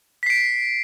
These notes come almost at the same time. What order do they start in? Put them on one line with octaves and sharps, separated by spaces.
B6 C7 D7